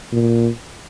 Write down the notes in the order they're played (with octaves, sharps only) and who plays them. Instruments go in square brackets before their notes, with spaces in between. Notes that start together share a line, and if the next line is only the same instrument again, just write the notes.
[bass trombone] A#2